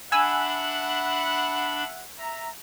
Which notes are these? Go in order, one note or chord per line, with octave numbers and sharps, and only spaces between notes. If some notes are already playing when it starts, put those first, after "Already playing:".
D4 E5 F#5 G#5 B5 E6
E5 A#5